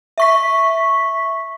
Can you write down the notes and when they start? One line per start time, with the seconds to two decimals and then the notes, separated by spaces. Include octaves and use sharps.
0.18 E5 C#6 B6